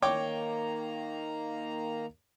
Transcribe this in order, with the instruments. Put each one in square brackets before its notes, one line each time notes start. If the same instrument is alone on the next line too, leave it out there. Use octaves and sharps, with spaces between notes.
[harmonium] D#3 A#3 A#5 [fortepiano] C#5 G5 D6